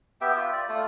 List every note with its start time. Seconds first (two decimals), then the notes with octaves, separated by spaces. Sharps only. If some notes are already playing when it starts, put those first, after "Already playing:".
0.21 B3 G4 E5 G5
0.37 F4
0.53 D5
0.69 A3 F4